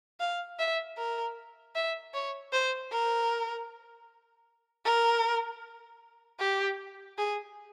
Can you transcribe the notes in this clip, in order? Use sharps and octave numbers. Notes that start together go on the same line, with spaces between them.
F5
E5
A#4
E5
C#5
C5
A#4
A#4
G4
G#4